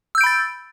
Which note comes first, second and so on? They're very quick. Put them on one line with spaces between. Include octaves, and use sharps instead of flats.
E6 G6 D7 B5 A6